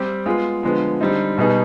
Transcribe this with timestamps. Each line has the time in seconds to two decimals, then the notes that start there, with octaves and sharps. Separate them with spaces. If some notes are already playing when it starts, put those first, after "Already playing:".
Already playing: G3 C4 G4
0.26 G#3 B3 F4 G#4
0.63 D3 F3 G#3 B3
1.01 D3 G3 C4 D#4
1.37 B2 G3 B3 D#4 G#4